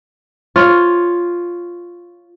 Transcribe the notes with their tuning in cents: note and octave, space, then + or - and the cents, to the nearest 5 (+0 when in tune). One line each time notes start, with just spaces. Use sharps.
F4 +0 C#5 +0